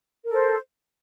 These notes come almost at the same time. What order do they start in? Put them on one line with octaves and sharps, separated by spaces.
A#4 A4 C5